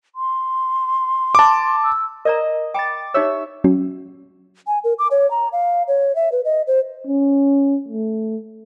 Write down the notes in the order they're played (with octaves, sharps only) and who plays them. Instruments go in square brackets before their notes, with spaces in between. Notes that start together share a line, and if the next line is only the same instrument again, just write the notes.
[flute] C6
[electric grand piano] A5 D6
[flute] E6
[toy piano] A#4 D5 A#5 [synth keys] D#5
[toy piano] G5 B5 [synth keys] D6 A6
[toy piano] D#4 G4 C#5 [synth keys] E5 C#6 E6
[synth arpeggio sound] F#3 C#4 F#4
[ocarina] G#5
A#4
D6
C#5
A#5
F5
C#5
E5
B4
D#5
C5
[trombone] C#4
A3